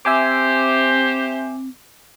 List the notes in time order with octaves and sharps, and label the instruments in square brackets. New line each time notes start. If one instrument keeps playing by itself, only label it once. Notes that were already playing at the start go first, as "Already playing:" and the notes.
[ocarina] C4 [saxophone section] G4 C5 [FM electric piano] E5 G#5 D6